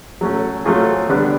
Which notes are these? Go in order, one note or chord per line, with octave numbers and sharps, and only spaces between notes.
F#3 A3 C#4
F#3 A3 C4 F4 G#4
D3 G3 B3 D4